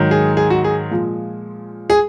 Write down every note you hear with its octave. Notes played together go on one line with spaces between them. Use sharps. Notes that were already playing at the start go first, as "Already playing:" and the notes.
Already playing: G#2 D#3 F#3
G#4
G#4
F#4
G#4
A#2 F3 G#3
G#4